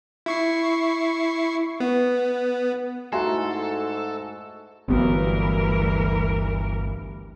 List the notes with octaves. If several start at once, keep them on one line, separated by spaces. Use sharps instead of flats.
E4 C#6 C7
B3
G#2 A3 E4 F#4 A4 G#5 A#5 C6
G1 D2 G2 E3 F#3 G3 B3 A#4